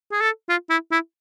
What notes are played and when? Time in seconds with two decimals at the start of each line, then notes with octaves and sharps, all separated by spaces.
0.12 G#4
0.21 A4
0.49 F4
0.70 E4
0.92 E4